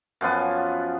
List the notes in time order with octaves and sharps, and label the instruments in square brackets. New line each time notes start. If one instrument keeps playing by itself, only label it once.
[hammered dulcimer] F#2 F3 B3 G#5